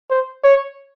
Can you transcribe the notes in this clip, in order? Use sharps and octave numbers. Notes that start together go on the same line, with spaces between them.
C5
C#5